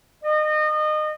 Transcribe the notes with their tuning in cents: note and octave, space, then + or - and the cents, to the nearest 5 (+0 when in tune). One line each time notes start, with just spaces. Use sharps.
D#5 -30